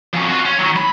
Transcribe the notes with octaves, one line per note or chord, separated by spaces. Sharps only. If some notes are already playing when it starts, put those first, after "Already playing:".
F2 C#4
F4 F#4
C#4
D#3 F#3
B5